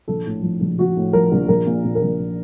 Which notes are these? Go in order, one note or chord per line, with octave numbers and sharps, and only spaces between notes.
A#1 A4
A2
F3
A#1
A#1 F#4
A2
F3 A#4
A#1
A#1 A#4
A#2
A#2
A#4
A#1
A#2